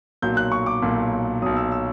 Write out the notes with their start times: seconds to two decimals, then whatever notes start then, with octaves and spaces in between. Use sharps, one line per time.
0.22 B1 A#2 F#3 G6
0.37 F#6
0.52 C#6
0.66 D6
0.82 B1 A#2 F#3
1.42 B1 A#2 F#3 D#6
1.56 E6
1.72 E6